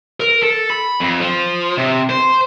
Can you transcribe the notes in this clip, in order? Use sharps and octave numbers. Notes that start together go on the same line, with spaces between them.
A#4
A4
B5
F2
F3
C3
C5